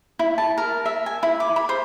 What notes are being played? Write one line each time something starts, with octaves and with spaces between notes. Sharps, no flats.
E4
A5
A#4
E5
G#5
E4
D6
B5
C5